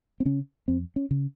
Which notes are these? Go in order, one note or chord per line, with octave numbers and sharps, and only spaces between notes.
C4
C#3 C#4
F2 C4
C#4
C#3